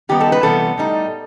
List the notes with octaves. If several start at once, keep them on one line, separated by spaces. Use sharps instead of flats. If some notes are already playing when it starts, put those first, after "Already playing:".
D#3 G3 B3 D#4 G4
A4
B4
C3 E3 G3 B3 A4
A2 G3 D#4